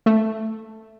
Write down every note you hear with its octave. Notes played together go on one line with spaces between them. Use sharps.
A3